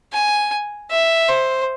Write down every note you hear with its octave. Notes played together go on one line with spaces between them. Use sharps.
G#5
E5
C5